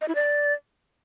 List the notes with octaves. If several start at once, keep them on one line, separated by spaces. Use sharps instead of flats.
D#5
E4
D5